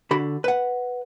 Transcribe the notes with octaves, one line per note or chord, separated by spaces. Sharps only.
D3 F#4 B5
B4 F#5